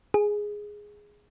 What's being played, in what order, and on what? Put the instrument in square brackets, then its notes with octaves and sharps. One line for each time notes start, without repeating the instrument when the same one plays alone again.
[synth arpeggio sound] G#4